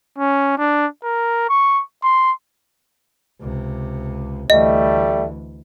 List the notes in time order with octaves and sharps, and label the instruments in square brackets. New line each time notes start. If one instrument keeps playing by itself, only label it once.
[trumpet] C#4
D4
A#4
C#6
C6
[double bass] C#2 C3
[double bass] D2 E3 [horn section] G3 A3 [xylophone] D#5